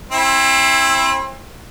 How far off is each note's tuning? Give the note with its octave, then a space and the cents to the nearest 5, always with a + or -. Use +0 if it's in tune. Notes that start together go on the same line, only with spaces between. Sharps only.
C4 +30 E4 +0